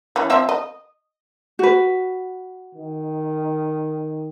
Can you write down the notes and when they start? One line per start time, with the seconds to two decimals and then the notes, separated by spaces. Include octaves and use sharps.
0.16 E3 C#4
0.30 F3 C4 E5
0.49 D#5
1.59 F#4 B4
2.75 D#3